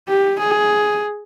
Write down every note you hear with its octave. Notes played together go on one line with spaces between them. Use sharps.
G4
G#4